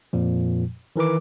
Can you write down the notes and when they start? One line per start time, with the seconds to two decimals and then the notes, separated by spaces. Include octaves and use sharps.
0.13 F2 A#2 F3
0.96 D#3 E3 A#4 B4 D6